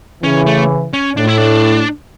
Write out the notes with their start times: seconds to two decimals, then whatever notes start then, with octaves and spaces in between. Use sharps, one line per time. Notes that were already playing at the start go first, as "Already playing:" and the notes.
0.23 C#3 E3 C#4
0.46 A3
0.93 C#4
1.17 A2 D4
1.27 E4
1.38 D4